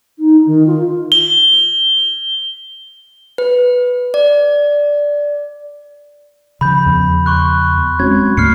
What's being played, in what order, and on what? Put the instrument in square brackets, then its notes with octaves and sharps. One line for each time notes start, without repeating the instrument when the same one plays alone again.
[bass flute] D#4
D#3
F4
[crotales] G7
[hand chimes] B4
D5
[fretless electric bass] C#3 F3 [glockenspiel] B5 G6
[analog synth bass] E2
[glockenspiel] C6 C#6 F#6
[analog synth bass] F#3 [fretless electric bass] G#3 C4 C#4 [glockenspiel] G#6
[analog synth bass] D2 [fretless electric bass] G#2 A3 A#3 [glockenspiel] F6 C7 C#7